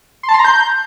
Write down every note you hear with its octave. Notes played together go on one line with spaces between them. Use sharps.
C6
A5
C6
A#5
G6